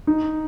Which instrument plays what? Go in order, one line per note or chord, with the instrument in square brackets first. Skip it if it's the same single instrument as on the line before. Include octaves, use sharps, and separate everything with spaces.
[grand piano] D#4